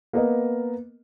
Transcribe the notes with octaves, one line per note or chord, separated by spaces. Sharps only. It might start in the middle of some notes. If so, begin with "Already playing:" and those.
A#3 B3 A#4 D#5